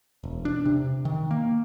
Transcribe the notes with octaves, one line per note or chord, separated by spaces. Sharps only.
E1
D4
C3
D#3
A#3